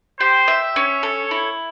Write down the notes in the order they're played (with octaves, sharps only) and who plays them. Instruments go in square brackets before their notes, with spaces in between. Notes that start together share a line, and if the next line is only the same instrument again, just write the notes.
[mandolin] G4 [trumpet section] C5
[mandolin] E5
[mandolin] C#4 [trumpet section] C#5
[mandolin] A4
E4